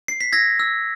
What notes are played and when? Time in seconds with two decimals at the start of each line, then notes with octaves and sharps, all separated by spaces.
0.08 C7
0.21 B6
0.32 E6 G#6 A#6
0.59 E6